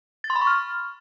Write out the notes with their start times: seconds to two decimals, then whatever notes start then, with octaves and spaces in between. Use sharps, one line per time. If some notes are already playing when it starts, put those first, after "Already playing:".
0.24 A6
0.30 C6
0.36 B5
0.41 C#6
0.47 F6